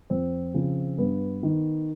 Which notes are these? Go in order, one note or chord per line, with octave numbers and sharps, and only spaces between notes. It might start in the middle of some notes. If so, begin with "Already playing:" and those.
F2 C4
C#3 F3
G2 B3
D#3